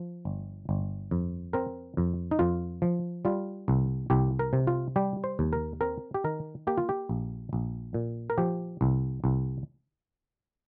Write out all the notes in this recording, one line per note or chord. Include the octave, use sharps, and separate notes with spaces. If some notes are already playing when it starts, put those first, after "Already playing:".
Already playing: F3
G1
G1
F2
C4 A#4
F2
D#4
F2 F4
F3
G3 F4
C2
C2 G4
A#4
C3
F4
G3 G4
C5
D#2
A#4
C4 A#4
G4
D#3 A#4
A#3 G4
F4
G4
A#1
A#1
A#2
A#4
F3 G4
C2
C2